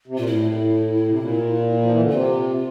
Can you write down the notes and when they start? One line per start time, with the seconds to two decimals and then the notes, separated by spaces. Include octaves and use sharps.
0.07 C3
0.17 A#2 F4
0.27 A2 E4
1.09 C3
1.19 A#2
1.82 F3
1.92 E3
2.01 D3
2.11 C3 F4